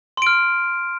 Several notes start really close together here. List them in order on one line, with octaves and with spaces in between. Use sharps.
C6 D7 F6